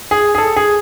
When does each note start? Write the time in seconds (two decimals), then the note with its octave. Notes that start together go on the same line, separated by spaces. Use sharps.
0.11 G#4
0.35 G#4
0.38 A4
0.56 G#4